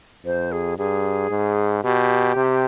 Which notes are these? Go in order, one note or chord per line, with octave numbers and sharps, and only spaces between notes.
F2 C5
G#4
G2 G#4
G#2
B2 G4
C3